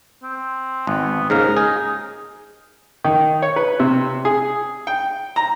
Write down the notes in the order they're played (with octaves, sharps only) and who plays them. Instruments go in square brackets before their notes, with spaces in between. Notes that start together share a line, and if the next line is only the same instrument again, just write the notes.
[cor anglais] C4
[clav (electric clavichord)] G#1 [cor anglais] B3
[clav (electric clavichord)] G#2 C#3 A#3 [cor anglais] A#4
[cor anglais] D#4 [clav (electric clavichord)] G#4
[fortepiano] D#3
C#5
B4
C3
G#4
G5
A#5